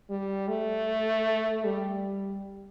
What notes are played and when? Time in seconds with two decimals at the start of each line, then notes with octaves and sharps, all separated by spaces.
0.10 G3
0.48 A3
1.65 G3